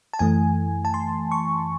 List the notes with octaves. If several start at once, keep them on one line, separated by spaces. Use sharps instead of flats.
A5
F#2 E3 A3 G#5
A5
C6
C#6